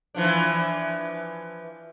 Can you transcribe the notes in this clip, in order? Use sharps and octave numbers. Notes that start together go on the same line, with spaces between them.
E3 F3 D4